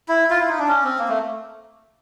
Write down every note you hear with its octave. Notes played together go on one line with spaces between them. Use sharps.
E4
F4
E4
D#4
D4
C#4
C4
A#3
A3